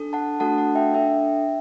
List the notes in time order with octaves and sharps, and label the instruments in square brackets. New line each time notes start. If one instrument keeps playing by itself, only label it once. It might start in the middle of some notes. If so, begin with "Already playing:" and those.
Already playing: [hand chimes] D4 A4
F#5 A5
A3 D4 F#4 A4 F#5 A5
F#5 A5
E5 G5
D4 A4 E5 G5